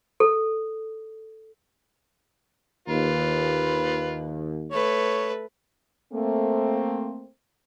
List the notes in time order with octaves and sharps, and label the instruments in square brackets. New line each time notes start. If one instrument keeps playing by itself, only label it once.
[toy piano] A4
[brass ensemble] D#2 [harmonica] F4 B4
[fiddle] A3 B4 [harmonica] C#5
[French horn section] A3 A#3 C4